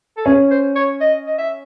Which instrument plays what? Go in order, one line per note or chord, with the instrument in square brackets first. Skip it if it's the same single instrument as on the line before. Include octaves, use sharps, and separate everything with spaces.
[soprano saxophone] A4
[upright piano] C#4 [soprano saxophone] G#4
[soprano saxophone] C5
C#5
D#5
D#5
E5